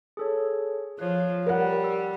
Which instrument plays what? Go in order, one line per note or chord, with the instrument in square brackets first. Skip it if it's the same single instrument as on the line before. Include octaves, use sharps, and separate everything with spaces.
[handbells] G#4 A4 C#5
[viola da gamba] F3 [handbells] C#5 F#6
[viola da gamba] G3 [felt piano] A#4 F#5
[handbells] E6